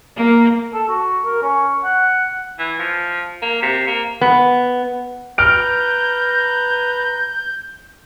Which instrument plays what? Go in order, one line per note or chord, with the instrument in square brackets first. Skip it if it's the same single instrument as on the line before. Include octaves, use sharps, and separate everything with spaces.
[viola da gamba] A#3
[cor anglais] A4
F#4
A#4
C#4
F#5
[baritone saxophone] E3
F3
A#3
C3
A#3
[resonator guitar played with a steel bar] B3
[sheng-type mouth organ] B4 A#5 [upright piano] F6 D7 [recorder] G6